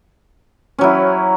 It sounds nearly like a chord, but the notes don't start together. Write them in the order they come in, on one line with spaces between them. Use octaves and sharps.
C#4 F#3 E4